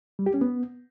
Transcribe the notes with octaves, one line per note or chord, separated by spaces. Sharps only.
G3
G4
C#4
B3